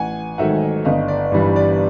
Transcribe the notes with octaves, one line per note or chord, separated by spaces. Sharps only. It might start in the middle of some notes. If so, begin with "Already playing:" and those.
Already playing: A1 F#5 G#5
G#2 D#3 F#3 A3 E5 F#5
G1 D#5 F5
D5
G2 E3 G3
D5